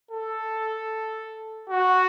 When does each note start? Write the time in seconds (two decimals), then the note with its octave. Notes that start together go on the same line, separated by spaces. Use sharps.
0.11 A4
1.70 F#4